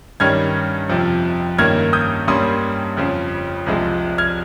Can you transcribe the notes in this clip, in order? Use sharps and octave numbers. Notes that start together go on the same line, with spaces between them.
G2 D#3 G3 C#4 F6 G#6
F2 C3 F3
G2 D#3 A#3 C#4 F6 G#6
D#6 G6
G2 G3 A#3 C#4 C6 D#6
F2 C#3 F3
C2 C3 F3 G#3
F6 G#6